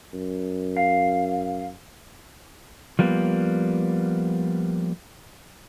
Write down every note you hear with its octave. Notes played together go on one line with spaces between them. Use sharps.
F#2
F5
F3 G3 A#3 B3